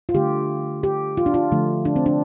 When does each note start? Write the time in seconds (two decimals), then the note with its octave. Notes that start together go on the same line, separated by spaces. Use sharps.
0.09 F4
0.14 D3 A3 G4
0.83 G4
1.17 F4
1.26 D4
1.34 F4
1.52 D3 F3 A3
1.85 D4
1.96 C4
2.06 D4